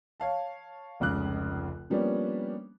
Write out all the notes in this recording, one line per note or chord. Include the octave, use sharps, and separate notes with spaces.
C#5 F5 A5
F1 C#2 C#3 D6 F#6
F3 G3 A#3 B3 C#4 D4